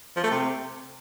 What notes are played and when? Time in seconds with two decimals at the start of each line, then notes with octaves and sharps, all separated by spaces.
0.16 F3
0.23 A3
0.31 C3